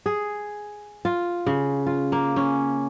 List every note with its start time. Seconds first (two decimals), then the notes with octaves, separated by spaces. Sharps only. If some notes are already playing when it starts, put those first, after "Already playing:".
0.06 G#4
1.05 F4
1.46 C#3
1.87 F4
2.12 A#3
2.36 C#4